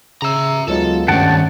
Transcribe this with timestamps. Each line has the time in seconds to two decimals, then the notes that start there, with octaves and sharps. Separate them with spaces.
0.22 C#3 E5 A#5 E6
0.68 D2 F#3 G#3 B3 D#4 F4 A4
1.08 G2 D#3 G3 A3 C#4 F#5 G5 A5